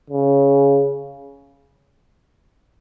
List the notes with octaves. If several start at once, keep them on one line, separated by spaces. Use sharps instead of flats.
C#3